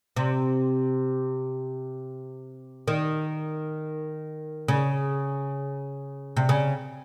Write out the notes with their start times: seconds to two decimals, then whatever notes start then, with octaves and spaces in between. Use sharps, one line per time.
0.16 C3
2.88 D#3
4.68 C#3
6.37 C3
6.49 C#3